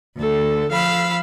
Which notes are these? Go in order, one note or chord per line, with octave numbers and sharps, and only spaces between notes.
D2 A4
F3 F5 B5 E6